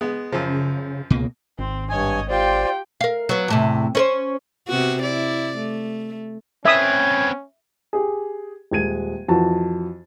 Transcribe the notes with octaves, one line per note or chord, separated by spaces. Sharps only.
G#3 B3
F#2 C#3 F3
C#2 B2 A#3
G#1 C4
G2 C#5 D#5 G#5
F4 G4 C5 D5 G5
A#4 F5
F#3 B3
E2 A2 C3
C#4 A#4 C5
C3 B3 F#4
E4 D5
A3
C4 C#4 B4 E5 D#6 G#6
G4 G#4
D#1 G#3 G#6 D#7
F2 E3 F#4 A5